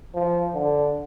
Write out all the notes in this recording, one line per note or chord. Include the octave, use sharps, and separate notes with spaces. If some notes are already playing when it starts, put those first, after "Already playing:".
F3
D3